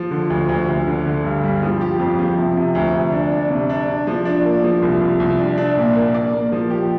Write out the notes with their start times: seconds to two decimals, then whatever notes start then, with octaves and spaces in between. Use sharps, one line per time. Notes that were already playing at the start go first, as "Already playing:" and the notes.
Already playing: F3
0.11 D3
0.30 D2
0.49 D2
0.68 D2
0.87 D3
1.06 D3
1.24 G2
1.43 G3
1.62 F3
1.81 G4
1.99 F2
2.19 F3
2.38 C3
2.56 C3
2.75 D2
2.94 D2
3.12 D4
3.32 D4
3.50 C3
3.70 D4
3.88 D4
4.07 F3
4.25 D4
4.45 A#3
4.64 F3
4.82 C2
5.01 C2
5.20 C2
5.39 D4
5.57 D4
5.77 A#2
5.95 A#3
6.14 D5
6.33 A#3
6.52 F3
6.70 G4